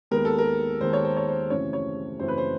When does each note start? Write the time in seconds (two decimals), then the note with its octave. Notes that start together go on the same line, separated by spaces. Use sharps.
0.11 D#2 D#3 G#3 B3 A#4
0.25 A4
0.38 A#4
0.81 D#2 D#3 G#3 B3 C5
0.93 C#5
1.05 C5
1.17 C#5
1.29 C5
1.50 F#2 C#3 E3 A3 C4 C#5
1.73 C#5
2.20 F#2 C#3 E3 A3 C4 C5
2.28 B4
2.38 C5